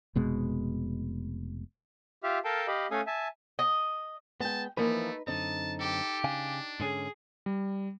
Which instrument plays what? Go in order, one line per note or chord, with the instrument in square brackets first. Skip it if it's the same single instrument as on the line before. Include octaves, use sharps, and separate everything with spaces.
[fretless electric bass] F1 B2 G#3
[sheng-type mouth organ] F4 G4 E5 F5 F6
A4 A#4 F5 G5 A5
G4 D#5 F5 B5
A3 C#4 A4 F5 G#5 D#6
E5 G#5 A5
[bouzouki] D#5
[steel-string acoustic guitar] G#3 G5 [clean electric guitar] B3 [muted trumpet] A5
[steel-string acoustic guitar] E3 F3 A#3 [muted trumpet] A3 [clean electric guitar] D#4 B4
[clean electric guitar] F#2 D3 C4 [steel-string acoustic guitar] D#4 [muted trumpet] A5
[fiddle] G4 [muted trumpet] A4
[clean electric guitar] C#3 F5 G#5 [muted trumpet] D4
[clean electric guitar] G#2 D3 C#4 [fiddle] G#4
[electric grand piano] G3